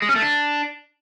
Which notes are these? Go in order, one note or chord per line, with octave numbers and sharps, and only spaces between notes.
G#3
C#4
A3
D4